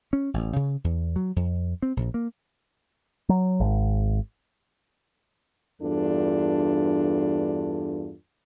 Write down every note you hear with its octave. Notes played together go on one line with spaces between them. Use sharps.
C#4
A1
C#3
E2
F#3
F2
C4
A#1
A#3
F#3
G#1
E2 G2 D4 F4 A4